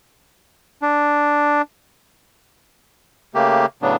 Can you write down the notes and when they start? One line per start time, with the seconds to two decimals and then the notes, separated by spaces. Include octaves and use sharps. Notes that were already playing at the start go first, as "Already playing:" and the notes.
0.82 D4
3.35 C#3 A3 A#3 G4
3.82 A2 C#3 F#3 B3 D4